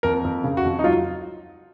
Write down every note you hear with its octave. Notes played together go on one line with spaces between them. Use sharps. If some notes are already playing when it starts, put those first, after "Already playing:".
F2 A#4
F2
C#3
F#4
F2
D#4
F#3 F4